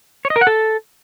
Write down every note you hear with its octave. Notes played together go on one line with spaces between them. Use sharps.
C#5
D#5
A#4
F#5
A4